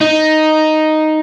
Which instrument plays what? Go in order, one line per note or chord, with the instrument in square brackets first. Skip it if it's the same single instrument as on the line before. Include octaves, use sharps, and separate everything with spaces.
[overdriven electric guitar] D#4